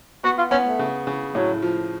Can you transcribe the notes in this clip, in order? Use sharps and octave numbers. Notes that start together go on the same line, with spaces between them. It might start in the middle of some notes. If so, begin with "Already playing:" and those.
B3 F#4
F4
B3 C#4
A3
C#3
C#3
A2 F#3
F3